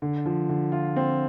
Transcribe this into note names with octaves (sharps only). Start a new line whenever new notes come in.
D3
F3
D3
F4
C4